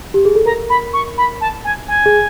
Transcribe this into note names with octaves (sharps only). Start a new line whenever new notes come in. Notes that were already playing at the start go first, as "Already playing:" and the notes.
G4
G#4
A4
A#4 A#5
B5
C#6
B5
A5
G#5
G#5
G#4